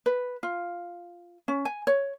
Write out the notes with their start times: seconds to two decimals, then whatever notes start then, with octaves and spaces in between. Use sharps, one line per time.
0.06 B4
0.43 F4
1.48 C#4
1.65 G#5
1.87 C#5